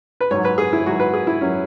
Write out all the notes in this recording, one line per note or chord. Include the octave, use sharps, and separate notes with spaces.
B4
G#2 F#3 C#5
B4
G#4
E4
G#2 F#3 F#4
B4
G#4
E4
F#3 C#4